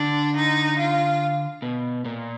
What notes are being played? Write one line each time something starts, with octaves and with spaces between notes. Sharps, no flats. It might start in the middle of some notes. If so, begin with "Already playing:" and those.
Already playing: D3 D4
D#4
F4
B2
A#2